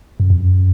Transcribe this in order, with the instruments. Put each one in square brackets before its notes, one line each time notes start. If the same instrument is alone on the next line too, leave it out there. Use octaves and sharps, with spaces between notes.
[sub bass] F#2
F2
F#2